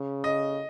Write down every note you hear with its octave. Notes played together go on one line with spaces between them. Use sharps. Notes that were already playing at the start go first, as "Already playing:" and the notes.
Already playing: C#3
D#5